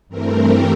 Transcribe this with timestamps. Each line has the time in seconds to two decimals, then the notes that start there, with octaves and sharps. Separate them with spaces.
0.08 G2 E3 A3 C4 A#4
0.38 G4